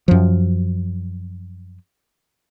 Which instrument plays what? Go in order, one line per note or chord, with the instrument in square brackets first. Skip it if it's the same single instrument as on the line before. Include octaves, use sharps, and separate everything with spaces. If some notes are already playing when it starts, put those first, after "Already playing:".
[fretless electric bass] F#2 F3